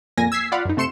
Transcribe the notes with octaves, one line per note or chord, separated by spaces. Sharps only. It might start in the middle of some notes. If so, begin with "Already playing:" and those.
F2 A#2 A#3 G#5 A#6
E6 G#6 B6 C7
F4 D5 F5 F#5 B5
F#2 D#4
C3 A3 C6 C#7 E7